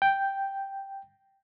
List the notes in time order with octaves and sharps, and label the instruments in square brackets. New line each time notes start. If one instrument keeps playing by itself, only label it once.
[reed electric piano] G5